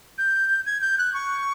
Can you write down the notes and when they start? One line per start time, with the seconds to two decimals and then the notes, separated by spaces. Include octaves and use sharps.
0.18 G6
0.66 G#6
0.82 G6
0.98 F#6
1.14 C#6